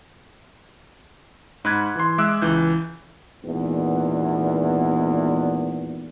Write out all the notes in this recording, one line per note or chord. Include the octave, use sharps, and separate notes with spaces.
G#2 B5 F#6 G#6
E3 C6
G#3 E5 D6 E6 F#6
C#2 E3 G6
G#1 E2 A#2 B3